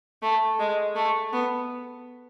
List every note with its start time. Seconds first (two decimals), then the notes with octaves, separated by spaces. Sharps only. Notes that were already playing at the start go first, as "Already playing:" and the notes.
0.23 A3
0.60 G#3
0.96 A3
1.33 B3